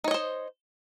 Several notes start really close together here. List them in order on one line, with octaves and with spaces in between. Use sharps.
D#4 C#5 D#5 C5